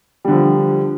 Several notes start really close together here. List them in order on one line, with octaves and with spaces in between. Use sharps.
G3 D3 F3